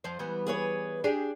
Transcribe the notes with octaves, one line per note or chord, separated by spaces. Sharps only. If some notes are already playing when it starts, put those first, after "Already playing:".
F2 F3 C5
E3 G3 B3
G#4 B4 C#5
D4 G4 G#4